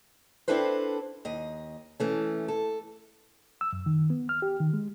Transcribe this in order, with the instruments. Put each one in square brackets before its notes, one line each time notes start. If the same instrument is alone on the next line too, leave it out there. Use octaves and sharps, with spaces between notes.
[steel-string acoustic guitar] C4 D4 E4 A4 B4 C5
D#2 D#5
E3 A3 C#4
A4
[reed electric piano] E6
F#2
D#3
B3
F6
G4
D#3
G#3